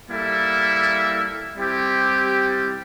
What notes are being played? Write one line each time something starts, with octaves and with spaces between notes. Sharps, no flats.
G3 A#3 E4 A4 E5
G3 C4 E4 G4